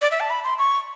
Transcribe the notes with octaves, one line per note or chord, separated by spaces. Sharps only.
D5
E5
A5
B5
C6
C#6